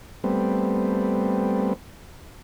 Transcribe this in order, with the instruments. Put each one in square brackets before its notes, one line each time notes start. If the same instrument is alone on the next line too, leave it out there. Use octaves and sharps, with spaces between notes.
[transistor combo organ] G3 A3 B3 C4